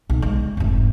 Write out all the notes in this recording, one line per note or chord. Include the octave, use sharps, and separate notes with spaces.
B1
G#3
F1 G#2